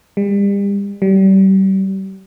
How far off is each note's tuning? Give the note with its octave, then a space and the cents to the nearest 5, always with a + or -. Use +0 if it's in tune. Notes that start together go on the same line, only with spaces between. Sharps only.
G3 +35
G3 -35